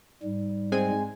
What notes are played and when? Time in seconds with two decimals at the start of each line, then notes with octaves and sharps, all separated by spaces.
0.23 G#2 G3
0.72 G#3 C4 G#5